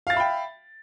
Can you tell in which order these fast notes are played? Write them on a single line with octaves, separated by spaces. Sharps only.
F5 A6 E5 B5 G5